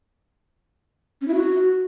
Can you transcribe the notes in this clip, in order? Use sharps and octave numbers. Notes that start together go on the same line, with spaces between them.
C#4
E4
F#4